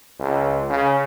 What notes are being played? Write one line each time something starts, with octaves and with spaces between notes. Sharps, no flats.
C#2
C#3